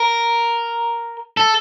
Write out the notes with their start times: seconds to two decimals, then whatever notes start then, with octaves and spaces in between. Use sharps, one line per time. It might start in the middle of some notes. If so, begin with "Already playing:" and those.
Already playing: A#4
1.37 A4